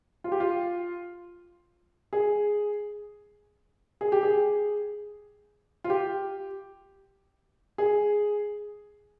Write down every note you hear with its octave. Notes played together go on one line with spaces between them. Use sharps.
F4
G4
F4
G#4
G#4
G4
G#4
F4
G4
G#4